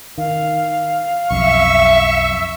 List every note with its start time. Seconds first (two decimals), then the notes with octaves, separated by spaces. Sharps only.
0.18 D#3 F5
1.30 B1 F2 E5 C#6